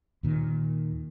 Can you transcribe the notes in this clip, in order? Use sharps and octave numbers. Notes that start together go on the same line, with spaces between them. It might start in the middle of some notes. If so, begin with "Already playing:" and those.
D#2 A#2 D#3